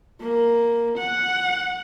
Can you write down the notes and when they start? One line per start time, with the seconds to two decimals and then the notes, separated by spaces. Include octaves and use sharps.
0.21 A#3
0.98 F#5